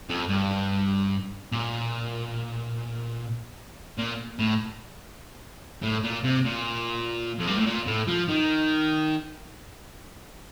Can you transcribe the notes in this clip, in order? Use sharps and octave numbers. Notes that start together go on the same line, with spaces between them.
F2
G2
A#2
A#2
A2
A2
A#2
C3
A#2
F2
G2
A2
A#2
A2
F3
D#3